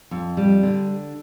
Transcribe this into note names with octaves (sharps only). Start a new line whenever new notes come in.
F2
G3
D3